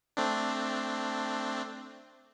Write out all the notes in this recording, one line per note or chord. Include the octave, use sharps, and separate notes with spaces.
A3 C4 D4